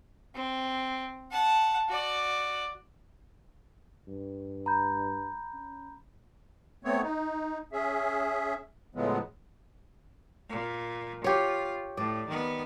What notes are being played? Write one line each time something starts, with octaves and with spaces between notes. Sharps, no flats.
C4
F#5 A5
F#4 D5
G2
A#5 B5 G6
C#4
A3 B3 C4 C#5
D#4
C#4 G#4 E5
A2 C#3 F3 F#3 G#3 B3
A#2
F4 G4 C#5
A2 D5
D#3 B3